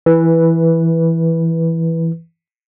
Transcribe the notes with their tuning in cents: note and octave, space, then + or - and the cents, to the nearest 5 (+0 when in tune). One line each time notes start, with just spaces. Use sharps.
E3 +0 B4 -10